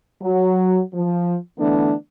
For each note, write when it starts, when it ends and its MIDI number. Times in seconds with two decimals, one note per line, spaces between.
0.22 0.80 54
0.94 1.35 53
1.59 1.92 50
1.59 1.92 52
1.59 1.92 57
1.59 1.92 59
1.59 1.92 62